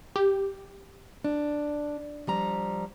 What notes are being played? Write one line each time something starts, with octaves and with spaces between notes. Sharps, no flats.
G4
D4
F3 G3 A#5